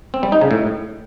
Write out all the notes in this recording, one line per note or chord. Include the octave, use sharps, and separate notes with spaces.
C4
G3
D#4
C#3
A2